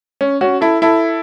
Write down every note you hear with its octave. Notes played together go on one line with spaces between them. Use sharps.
C#4
C#4 F#4
E4 A4
E4 A4